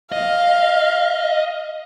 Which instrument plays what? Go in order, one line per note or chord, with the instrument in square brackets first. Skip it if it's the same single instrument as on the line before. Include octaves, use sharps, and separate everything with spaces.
[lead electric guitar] D#5 [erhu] F5